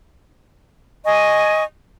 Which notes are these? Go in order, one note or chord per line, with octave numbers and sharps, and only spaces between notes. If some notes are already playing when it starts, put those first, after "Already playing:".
D#5 G#5 C#6